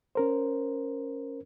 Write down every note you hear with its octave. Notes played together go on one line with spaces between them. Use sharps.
C#4 A#4 C5